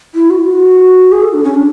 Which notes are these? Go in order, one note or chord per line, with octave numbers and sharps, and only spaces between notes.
E4
F#4
E4
F#4
G#4
A4
D4
C#4
D4